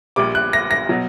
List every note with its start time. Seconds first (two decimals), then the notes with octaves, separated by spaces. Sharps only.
0.16 A#1 A#2 G3 D6
0.35 F#6
0.53 A#6
0.71 A#6
0.89 B2 F#3